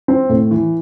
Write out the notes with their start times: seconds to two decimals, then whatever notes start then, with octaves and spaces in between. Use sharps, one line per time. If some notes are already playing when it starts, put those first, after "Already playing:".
0.08 C4
0.29 A2
0.51 E3